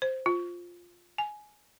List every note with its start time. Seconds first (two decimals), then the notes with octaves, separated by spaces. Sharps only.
0.02 C5
0.26 F4
1.18 G#5